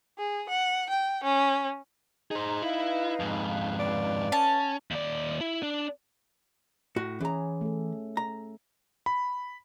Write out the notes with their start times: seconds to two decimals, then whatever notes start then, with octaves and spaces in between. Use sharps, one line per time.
0.18 G#4
0.49 F#5
0.90 G5
1.24 C#4
2.31 D#4 G#4 C5 A#5
2.62 E4 B4 F5
3.20 F2 G#2
3.79 D5
4.32 C#4 A5
4.91 D#2 D5
5.41 E4
5.63 D4
6.96 A2 F#4
7.21 E3 C#4 G#4 A#5
7.61 A3 A4
8.17 A#5
9.06 B5